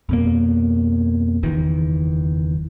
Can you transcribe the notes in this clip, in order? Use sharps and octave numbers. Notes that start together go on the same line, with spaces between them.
F2 B2 A#3
F#1 E2 D#3 E3